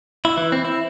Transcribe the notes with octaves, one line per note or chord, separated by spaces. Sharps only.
E4
E3
C4
E4